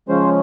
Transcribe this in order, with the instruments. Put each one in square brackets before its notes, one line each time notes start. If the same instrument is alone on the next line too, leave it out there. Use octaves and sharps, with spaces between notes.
[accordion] C#3 F3 G#3 C#4 C5